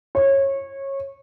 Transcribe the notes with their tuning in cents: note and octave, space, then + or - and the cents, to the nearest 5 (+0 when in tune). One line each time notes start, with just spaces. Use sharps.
C#5 -20